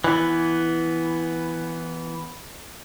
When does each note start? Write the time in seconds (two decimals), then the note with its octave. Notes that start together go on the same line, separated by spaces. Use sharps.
0.04 E3 B3